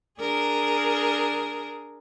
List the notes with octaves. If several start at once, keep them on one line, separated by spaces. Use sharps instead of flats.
D4 G#4 A#4